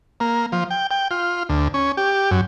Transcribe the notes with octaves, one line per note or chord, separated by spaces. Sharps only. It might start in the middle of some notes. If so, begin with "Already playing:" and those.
A#3
F3
G5
G5
F4
D2
C#4
G4
F#2